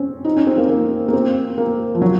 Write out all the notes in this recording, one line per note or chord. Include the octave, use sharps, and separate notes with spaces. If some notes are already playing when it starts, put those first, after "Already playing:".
Already playing: C4 C#4
D#4
C#4
C4
A#3
A#3
A#3
C4
A#3
F3
F#3